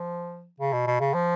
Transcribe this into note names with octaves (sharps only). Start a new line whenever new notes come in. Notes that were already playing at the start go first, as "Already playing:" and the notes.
Already playing: F3
C#3
B2
B2
C#3
F3